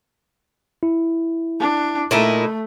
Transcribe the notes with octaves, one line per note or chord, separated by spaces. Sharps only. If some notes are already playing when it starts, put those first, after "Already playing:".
E4
D4
A#2 A3 D#4 E4